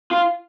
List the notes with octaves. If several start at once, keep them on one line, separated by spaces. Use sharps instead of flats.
F4